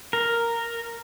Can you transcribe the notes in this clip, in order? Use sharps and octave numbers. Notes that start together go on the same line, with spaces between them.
A#4